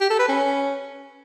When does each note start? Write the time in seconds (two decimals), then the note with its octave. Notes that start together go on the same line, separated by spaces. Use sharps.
0.01 G4
0.10 A4
0.19 B4
0.29 C#4